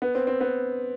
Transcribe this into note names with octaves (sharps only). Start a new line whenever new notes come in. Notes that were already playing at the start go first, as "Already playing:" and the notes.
B3
C4
C4
B3